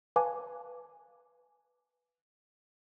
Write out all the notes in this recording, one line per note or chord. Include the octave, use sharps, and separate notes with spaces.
B4 F5 G#5 A5 D6